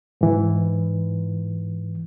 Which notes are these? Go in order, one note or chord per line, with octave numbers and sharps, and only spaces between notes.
G#2 E3